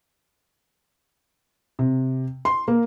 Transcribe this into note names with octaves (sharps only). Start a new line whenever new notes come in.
C3
C6
A#3